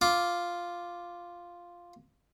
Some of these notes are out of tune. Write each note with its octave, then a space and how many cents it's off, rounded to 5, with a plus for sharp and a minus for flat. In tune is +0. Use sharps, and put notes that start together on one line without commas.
F4 +0 D6 -5